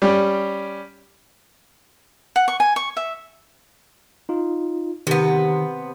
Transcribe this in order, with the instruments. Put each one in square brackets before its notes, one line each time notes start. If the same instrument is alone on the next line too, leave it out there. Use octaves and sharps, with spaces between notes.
[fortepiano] G3 C#4 G4
[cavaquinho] F#5
C#6
G#5
C#6
E5
[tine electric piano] D#4 F4
[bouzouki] C3 B3 [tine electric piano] D#3